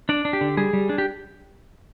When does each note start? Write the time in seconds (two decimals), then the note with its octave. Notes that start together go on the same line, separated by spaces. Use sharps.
0.09 D4 D5
0.25 D4
0.33 G4
0.41 D3
0.57 G3 G#4
0.73 G3
0.89 D4
0.98 G4